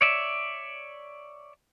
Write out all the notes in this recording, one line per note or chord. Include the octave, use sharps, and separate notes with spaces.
C#5 D5 E5